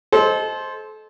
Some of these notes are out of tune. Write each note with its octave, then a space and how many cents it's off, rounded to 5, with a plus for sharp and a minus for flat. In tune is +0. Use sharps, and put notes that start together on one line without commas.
A4 -30 C5 +5 D#5 +0